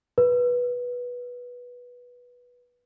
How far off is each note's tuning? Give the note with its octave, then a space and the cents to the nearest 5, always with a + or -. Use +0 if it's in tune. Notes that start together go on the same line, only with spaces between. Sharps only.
B4 -15